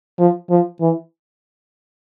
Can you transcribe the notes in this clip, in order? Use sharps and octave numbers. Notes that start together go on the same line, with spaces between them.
F3
F3
E3